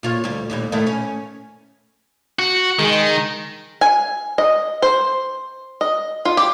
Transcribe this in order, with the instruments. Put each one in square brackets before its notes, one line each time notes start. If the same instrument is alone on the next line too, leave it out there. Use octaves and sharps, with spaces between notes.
[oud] A#2 F4 C#5
D2 G3
D#2 A#2 G3
A2 D#3 A3
C#4
[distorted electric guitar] F#4
[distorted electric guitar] D#3 [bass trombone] G#3
[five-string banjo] G#5
D#5
C5
D#5
F4
G4